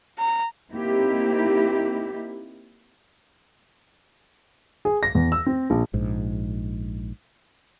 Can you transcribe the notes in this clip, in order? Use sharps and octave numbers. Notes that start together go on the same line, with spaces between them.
A#5
A#3 C4 D#4 E4 G4
G#4
A#6
E2
E6
C4
A#1
A#1 G#2